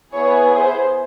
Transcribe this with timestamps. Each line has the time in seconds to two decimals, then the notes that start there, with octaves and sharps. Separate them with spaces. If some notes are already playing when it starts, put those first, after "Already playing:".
0.13 B3 E4 G#4 C#5
0.56 C5